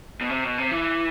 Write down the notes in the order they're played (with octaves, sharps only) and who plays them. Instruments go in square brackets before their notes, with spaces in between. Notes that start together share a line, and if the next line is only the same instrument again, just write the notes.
[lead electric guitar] B2
C3
B2
C3
E3